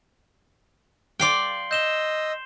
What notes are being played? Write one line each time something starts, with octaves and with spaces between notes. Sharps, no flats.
D5 F5 G5 C6 C7 G7
D#5 E6 G6 E7 G7